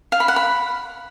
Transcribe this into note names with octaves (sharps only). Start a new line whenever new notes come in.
F5
B5
F#5
B5